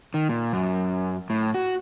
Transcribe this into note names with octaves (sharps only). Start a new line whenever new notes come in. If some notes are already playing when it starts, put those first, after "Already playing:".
D#3
A#2
F#2
A2
F#4